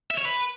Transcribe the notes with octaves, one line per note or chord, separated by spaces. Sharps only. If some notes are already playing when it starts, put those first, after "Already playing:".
E5
C#5
B4